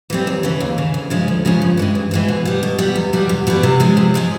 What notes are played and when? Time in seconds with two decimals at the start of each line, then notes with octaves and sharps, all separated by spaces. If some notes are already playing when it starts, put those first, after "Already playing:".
0.10 E3 G3 C4
0.27 D#2
0.43 C#3 E3
0.60 D#2
0.78 C#3 E3
0.94 D2
1.10 C#3 F3 G#3 C#4
1.28 D2
1.45 C#3 F3 G#3 C#4
1.62 G2
1.77 E3 G#3 C4
1.95 G2
2.11 E3 G#3 C4
2.28 B2
2.45 G3 B3
2.63 B2
2.79 G3 B3
2.96 E2
3.13 B2 G3 B3
3.29 E2
3.47 B2 G3 B3
3.63 C3
3.80 F3 G#3 C#4
3.97 C3
4.14 F3 G#3 C#4